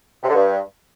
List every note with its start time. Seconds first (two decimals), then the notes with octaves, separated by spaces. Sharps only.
0.23 C3
0.29 D3
0.35 G2